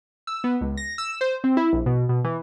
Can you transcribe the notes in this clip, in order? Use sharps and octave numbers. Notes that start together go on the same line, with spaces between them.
E6
B3
C#2
A#6
E6
C5
C4
E4
A#1
B2
B2
E3